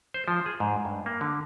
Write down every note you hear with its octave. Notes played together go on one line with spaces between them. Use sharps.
C5
F3
G#4
G#2
G2
A#3
D3